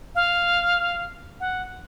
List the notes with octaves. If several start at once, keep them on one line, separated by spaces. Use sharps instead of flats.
F5
F#5